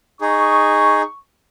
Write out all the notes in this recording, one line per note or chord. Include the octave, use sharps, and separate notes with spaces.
D#4 G#4 C#6